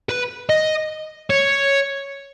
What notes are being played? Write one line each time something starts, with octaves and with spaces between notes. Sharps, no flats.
B4
D#5
C#5